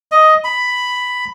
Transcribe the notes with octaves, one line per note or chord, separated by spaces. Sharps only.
D#5
B5